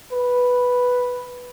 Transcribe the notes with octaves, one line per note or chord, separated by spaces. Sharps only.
B4